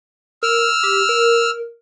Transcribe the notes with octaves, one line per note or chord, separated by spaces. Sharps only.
A#4 E6 F6
G4
A#4